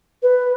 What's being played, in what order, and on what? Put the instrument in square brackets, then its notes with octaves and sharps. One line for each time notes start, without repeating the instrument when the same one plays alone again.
[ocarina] B4